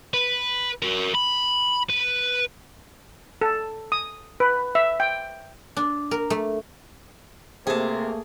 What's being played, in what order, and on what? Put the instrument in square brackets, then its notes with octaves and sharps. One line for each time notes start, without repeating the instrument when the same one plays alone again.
[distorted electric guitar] B4
F#4 A#4
B5
B4
[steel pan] A4
D#6
B4
E5
G5
[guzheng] D4
A#4
A3
[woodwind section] C3 [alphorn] A3 [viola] A#3 [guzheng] G#4 A5